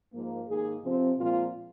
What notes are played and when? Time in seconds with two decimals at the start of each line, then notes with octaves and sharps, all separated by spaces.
0.13 G#2 F3 A#3
0.47 G#2 D#3 A#3 G#4
0.83 C3 F3 C4
1.19 A#2 F3 G#3 C4 F4